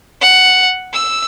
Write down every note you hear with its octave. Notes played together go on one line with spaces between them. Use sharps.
F#5
E6